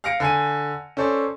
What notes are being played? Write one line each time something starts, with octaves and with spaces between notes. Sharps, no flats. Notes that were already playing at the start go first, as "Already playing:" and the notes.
F5 F6 A#6 C#7 D7
D3 G#5 D#7
C#4 A4 C5 D5